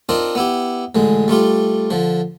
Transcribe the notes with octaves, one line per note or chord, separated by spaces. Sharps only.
C4 D4 D#4 F4 A#4
B3 E4 G4
A1 D3 G#3
G3 A3 F4 G4
D3 F3